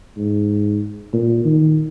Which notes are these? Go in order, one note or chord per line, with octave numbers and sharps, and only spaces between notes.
G#2
A#2
D#3